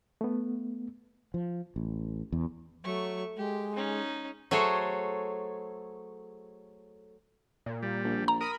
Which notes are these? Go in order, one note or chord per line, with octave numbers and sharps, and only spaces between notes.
A3 B3
F3
A1
E2
F#3 A3 C#6
G#3 G4
C#4 D#4
F#3 A3 G#4 A4 C5 C#5
A#2
G3
A#1
A#5
A#4 B5 D#6